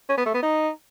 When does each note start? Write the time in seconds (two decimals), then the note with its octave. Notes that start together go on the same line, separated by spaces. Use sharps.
0.09 C#4
0.17 B3
0.26 A3
0.34 B3
0.42 D#4